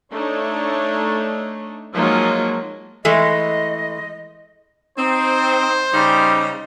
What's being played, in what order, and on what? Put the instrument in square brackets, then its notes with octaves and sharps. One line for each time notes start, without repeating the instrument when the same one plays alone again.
[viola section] A3 D4 D#4 C#5
F3 F#3 G#3 A#3 D#4 F4
[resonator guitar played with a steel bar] E3 G#3 A3 [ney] D#5
[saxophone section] C4 [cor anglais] D#4 [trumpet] C5
[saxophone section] C#3 D#4 [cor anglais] G3